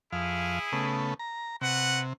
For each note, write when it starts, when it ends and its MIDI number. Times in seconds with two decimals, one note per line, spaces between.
0.12 0.59 41
0.12 1.03 64
0.12 1.03 68
0.12 0.59 77
0.72 1.14 49
0.72 1.14 57
0.72 1.14 59
1.19 1.56 82
1.61 2.13 48
1.61 2.01 66
1.61 2.01 71
1.61 2.01 78